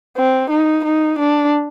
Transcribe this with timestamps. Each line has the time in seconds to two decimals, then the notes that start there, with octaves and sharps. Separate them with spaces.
0.17 C4
0.50 D#4
0.85 D#4
1.19 D4